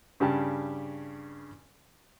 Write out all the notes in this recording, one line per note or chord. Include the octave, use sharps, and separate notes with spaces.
G2 C#3 G4 A5